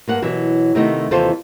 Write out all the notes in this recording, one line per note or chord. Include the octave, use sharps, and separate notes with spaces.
G2 A#3 F#5
B2 E3 F#3
C3 D#3 A3 B3 D#4
D#2 C3 E3 F4 A4 C5